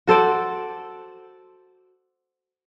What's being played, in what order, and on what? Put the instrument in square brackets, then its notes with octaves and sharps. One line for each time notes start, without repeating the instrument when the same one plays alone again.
[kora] F#4 A4 C5 D5